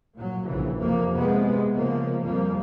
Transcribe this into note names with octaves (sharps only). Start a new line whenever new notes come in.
A#2 F#3
A#1 C#3 E3
F2 C3 A#3
C3 G#3 B3
C#3 F3 A#3
F2 F3 G3 A#3